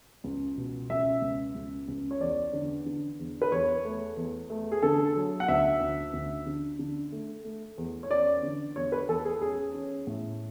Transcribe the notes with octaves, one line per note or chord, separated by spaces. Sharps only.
C#2
B2
C#2 E5
C#2
C#2
C#2
C#5
E2 D5
D3
D3
E2
B4
E2 C#5
A3
E2
A3
G#4
D3 A4
F#3
F#5
D2 E5
D2
D2
D3
D3
A3
A3
E2
C#5
C#4 D5
D3
E2 C#5
B4
E2 A4
G#4
C#4 G#4
C#4
A2